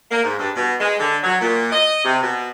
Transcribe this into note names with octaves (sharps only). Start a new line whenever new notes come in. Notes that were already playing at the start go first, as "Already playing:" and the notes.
A#3
G#2
G2
B2
G#3
D3
F#3
A#2
D#5
C3
B2